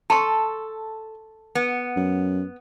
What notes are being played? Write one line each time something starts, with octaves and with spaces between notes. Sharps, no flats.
A4 A5 C6 C#6
B3
F#2